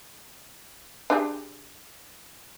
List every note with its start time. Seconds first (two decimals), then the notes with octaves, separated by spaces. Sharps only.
1.10 D4 G4 G#4